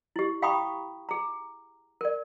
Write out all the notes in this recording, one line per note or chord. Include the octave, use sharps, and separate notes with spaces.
E4 G4
F5 G5 A#5 B5 C#6 D#6
G#4 A#5
A#4 D5